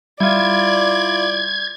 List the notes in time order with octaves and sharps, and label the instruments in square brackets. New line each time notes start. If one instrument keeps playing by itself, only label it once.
[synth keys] G3 [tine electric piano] E4 F4 [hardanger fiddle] D5 [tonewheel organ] G#6